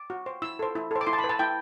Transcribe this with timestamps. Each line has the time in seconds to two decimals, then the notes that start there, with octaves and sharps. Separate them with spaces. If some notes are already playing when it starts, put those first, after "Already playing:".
Already playing: D6
0.10 F#4
0.26 C5
0.42 E4 E6
0.59 A4 C5
0.75 E4
0.91 A4 C5
1.01 D6
1.07 E4 C6
1.13 A5
1.18 B5
1.24 B4
1.29 A5
1.39 E4 G5